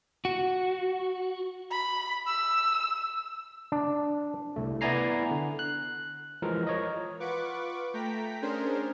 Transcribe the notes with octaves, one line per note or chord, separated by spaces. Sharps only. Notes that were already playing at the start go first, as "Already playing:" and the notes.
F#4
B5
E6
D4
C2 A3
B3 E4 D5 G#5 A#5 C7
D3
F#6
E3 F3 G#3 A#4
A#4 C#5 D#5
F4 B4 F#5 C#6 D6
A3 G5 A#5 B6
C#4 D4 G#4 A#4 C5